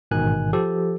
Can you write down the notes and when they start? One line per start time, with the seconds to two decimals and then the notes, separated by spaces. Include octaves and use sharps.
0.11 A1 G#2 B2 D#3 G#5 F#6
0.53 F3 G4 A4